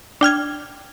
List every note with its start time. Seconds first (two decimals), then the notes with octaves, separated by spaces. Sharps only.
0.21 D4 G5 F6 G#6